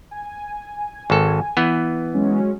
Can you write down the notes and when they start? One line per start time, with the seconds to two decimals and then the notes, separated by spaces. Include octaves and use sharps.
0.11 G#5
1.10 G#1 A4
1.57 E3 B3
2.14 F#3 G#3 C#4